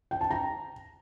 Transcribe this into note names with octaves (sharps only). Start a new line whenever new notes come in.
G5
A5
A#5